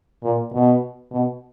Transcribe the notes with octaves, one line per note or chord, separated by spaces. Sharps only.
A#2
B2
B2